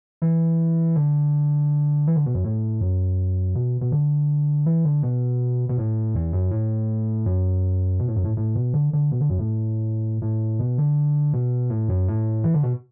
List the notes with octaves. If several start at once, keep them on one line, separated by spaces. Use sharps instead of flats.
E3
D3
E3
D3
B2
F#2
A2
F#2
B2
B2
D3
E3
D3
B2
B2
A2
E2
F#2
A2
F#2
B2
A2
F#2
A2
A2
B2
D3
D3
B2
D3
F#2
A2
A2
B2
D3
B2
A2
F#2
A2
E3
D3
B2